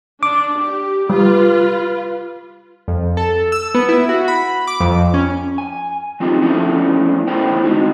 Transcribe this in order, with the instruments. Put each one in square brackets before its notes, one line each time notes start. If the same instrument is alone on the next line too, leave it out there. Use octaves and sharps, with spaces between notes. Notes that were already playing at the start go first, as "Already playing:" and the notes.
[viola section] D4 [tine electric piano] D6
[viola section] G4
[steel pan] G3 [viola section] F4 B4
[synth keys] F2
A4
E6
B3
E4
F#4
B5
D6
F2
C#4
[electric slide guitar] G#5
F#3 C4 D#4 F4 G4
F3 A3 B3 C#4 D4 E4
A3 B3 E4 A#4 C5 G5
G#3 C4 D#4 F#4